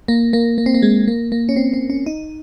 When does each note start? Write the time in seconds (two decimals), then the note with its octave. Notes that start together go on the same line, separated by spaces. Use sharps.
0.08 A#3
0.33 A#3
0.58 A#3
0.66 C4
0.74 A#3
0.82 G#3
1.08 A#3
1.32 A#3
1.49 C#4
1.56 C4
1.73 C4
1.90 C#4
2.06 D#4